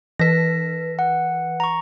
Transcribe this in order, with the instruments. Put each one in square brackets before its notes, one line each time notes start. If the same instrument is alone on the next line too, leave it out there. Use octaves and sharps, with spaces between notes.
[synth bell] E3 B4 [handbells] A#6 B6
[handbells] F#5
A#5 C#6